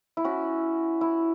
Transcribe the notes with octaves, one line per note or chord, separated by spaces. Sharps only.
E4
C#4 F#4
E4